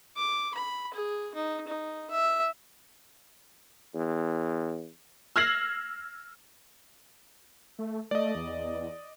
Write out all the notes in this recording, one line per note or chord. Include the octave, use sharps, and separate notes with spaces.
D6
B5
G#4
D#4
D#4
E5
E2
E6 F6 G#6 A#6 C7 F#7
A3
A3 D5 D#5
E2